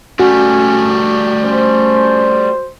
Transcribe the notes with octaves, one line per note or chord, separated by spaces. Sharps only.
G3 A3 C#4 F#4
C#4 C5